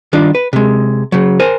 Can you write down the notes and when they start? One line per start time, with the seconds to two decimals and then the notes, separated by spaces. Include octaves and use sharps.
0.13 D#3 G3 D4 F4
0.35 B4
0.53 C3 G#3
1.12 C#3 F#3
1.40 A#4 C5 G#5